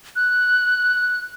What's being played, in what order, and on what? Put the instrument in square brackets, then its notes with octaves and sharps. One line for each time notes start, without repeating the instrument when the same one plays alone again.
[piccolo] F#6